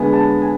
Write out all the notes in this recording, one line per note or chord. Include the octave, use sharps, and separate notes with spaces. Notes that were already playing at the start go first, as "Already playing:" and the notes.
Already playing: D3 G#3 B3 G#5
A5
G#5